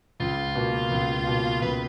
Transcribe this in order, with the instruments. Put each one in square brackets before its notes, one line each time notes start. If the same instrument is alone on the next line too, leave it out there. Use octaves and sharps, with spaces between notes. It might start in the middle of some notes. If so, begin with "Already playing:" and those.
[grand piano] C#2 [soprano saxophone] F4
[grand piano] B2 A#3
C#2
B2 A#3
[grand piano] C#2 [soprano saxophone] B4